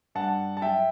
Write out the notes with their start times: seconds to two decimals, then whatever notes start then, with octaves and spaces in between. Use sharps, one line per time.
0.15 G2 F#5 A5
0.57 A5
0.62 F#3 E5 G5